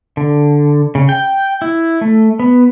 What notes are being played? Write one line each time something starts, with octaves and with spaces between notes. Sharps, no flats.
D3
C#3
G5
E4
A3
B3